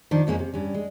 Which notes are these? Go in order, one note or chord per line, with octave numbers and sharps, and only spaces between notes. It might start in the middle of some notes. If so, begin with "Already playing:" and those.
D#3 F3 D4
F2 G#3 A#3 C#4
C3
G2 C#4
G#3